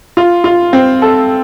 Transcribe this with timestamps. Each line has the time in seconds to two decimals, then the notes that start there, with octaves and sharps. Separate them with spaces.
0.17 F4
0.44 F4
0.73 C4
1.02 A4